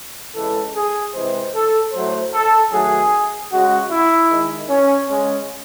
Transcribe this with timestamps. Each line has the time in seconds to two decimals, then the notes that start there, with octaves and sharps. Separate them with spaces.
0.35 C#3 E3 G#3 A4
0.75 G#4
1.14 C3 E3 G#3 C5
1.54 A4
1.93 A2 F#3 A3 C5
2.33 A4
2.72 D#3 F#3 A3 G#4
3.51 C#3 G#3 F#4
3.90 E4
4.29 D#3 G#3
4.69 C#4
5.08 C#3 G#3 C#4